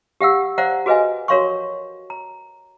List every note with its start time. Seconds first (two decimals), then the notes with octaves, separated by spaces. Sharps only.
0.21 G4 F5 F#5 E6
0.58 C5 D5 F5 F#5 A#5
0.86 F#4 G#4 B4 D#5 F5 G#5
1.28 F#4 A#4 C#5 F5 C6 C#6
2.10 A#5